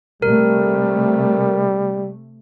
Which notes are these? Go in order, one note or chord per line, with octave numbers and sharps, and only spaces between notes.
C3 G3 A3 A#4